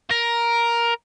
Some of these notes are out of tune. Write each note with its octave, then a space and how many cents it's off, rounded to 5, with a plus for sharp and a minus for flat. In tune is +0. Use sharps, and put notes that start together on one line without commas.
A#4 +10